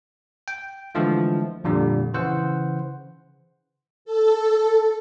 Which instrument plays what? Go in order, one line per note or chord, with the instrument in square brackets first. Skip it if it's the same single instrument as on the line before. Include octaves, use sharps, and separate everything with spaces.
[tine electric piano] G5
D3 E3 F3 G#3 A3
F2 A#2 D3 G3
C#3 E3 C5 F#5
[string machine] A4